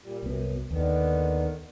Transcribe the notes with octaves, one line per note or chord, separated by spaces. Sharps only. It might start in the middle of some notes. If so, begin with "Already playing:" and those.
A#2 G3
C2 F#2 B3
D#2 D3 D#3 B3